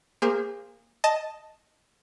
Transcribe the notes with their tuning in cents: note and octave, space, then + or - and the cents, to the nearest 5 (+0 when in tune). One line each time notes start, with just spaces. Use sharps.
A#3 +0 G#4 -35 C5 +0
D#5 +0 A5 +0